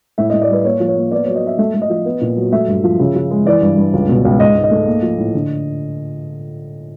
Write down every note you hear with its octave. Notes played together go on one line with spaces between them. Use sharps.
A2 E5
D#5
A2
D5
G3 B4
A#3 C#5
F3
C#5
A#3
B3 D5
C#5
F#3
D#5
B3 E5
A3 E5
A3
D#5
F3
B3
A#2
F#3
A3 E5
G2
F3
C#3
F3
G#3
E3 D5
G2
G2
C#2
B2
C#2
G#2 D#5
G#2
D#5
A3
A#3
F3
A2
D3